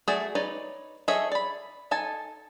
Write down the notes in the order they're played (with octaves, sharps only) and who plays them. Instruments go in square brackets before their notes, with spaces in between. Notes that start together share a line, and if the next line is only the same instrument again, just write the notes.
[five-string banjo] A3 F#4 G#4 D5
D#4 B4 C#5 D5
G#4 A4 C#5 D#5 E5
D5 B5
D#4 A4 G#5 A5